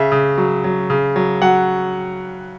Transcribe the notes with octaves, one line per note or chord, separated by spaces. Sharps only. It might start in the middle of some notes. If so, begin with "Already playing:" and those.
Already playing: C#3 E5
C#3
F#3
F#3
C#3
F#3
F#3 F#5